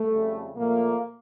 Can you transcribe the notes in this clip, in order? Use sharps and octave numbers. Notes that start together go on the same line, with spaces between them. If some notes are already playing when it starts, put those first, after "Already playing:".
Already playing: A3
F2 C#3 G3
A#2 F3 A3 A#3